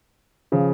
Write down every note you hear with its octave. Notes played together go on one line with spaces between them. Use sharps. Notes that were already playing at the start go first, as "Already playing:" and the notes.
C#3 F3